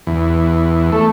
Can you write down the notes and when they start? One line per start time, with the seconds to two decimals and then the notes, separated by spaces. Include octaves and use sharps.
0.07 E2
0.92 A3